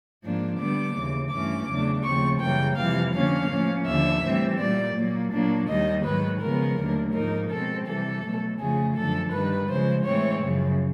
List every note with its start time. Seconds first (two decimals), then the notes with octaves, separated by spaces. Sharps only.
0.23 G#2 F3 A#3 D4
0.59 D3 G3 B3 D4 D6
0.95 D#2 C#3 E3
1.31 G2 E3 A3 C#4 D6
1.68 E2 C#3 F#3 A3 D4
2.04 D#2 C#3 F3 A3 C4 C#6
2.41 F#2 C#3 E3 G3 A#3 G5
2.77 F2 C3 E3 G3 F5
3.14 D3 F3 A#3 C#4 F5
3.50 A2 F3 A#3 C#4
3.87 D#2 D3 F3 E5
4.23 A2 E3 G3 C4
4.59 A#2 G3 A#3 D5
4.96 A#2 F#3 A#3
5.32 A#2 F#3 A#3 D4
5.69 D#2 D#3 G3 A#3 D#5
6.05 G#2 D#3 F#3 B4
6.41 C#3 F3 G#3 B3 A#4
6.79 D#2 D3 F#3 A3
7.14 G#2 F3 A#3 D#4 A#4
7.51 B2 G#3 C4 A4
7.87 C3 E3 G3 A4
8.24 B2 F#3 A3
8.60 F2 C#3 F3 A3 G#4
8.97 F#2 D3 F3 A4
9.32 G2 D#3 G3 B4
9.69 C#3 F3 G#3 C5
10.05 A2 E3 G#3 C4 C#5
10.42 F#2 C#3 F3